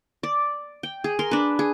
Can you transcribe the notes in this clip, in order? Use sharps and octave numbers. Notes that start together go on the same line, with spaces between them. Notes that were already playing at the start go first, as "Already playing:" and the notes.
D5
G5
G#4
A#4 C6
D4 B4
G#4